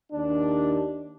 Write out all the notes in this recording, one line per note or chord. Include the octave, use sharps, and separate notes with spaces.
D#2 D4